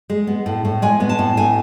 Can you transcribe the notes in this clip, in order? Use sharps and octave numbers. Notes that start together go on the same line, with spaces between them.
G#3
B3
A2
A2
G#3 G#5
B3
A5
A2
A2 G#5